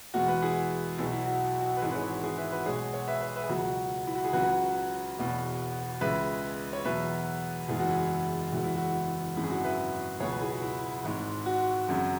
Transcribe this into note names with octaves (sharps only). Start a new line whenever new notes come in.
E2 B2 G#3 F#4
F#4 B4
E4 G#4
B1 B2 F#3 E4
E4
F#4
F#4
B4
G#1 G#2 E3 E4 G#4
B4
G#4 C#5
F#4
E4 G#4
B4 E5
F#4 B4
B1 B2 G#3 G#4 C#5
C#5 F#5
B4 E5
B4 E5
B4 E5
G#4
C#2 B2 F#3 F#4
E4
F#4
G#4
C#2 C#3 F#3 F#4 B4
E1 E2 B2
C#2 C#3 G#3 B4 E5
C#5
E2 B2 F#3 B4 E5
F#1 E2 E3 G#3 G#4
F#4
E4 G#4
F#1 E2 E3 G#3 F#4
E4
F#4
G#1 F#2 C#3 G#3 E4
G#4
F#4
B4 E5
C#2 B2 F#3 G#4 C#5
B4
E4 G#4
F#4
E4
G#1 G#2 G#3
F#4
G#1 F#2 C#3 F#3